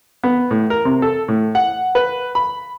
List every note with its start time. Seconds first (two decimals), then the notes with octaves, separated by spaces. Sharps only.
0.24 B3
0.51 A2
0.70 A#4
0.85 C3
1.02 A4
1.28 A2
1.55 F#5
1.95 B4
2.35 B5